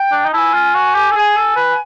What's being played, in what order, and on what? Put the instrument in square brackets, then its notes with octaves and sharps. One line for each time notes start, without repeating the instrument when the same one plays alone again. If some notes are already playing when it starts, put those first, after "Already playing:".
Already playing: [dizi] G5
[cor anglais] D4
D#4
[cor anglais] E4 [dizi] G#5 A5
[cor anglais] F4
F#4
G4
A4
G#4
A4
B4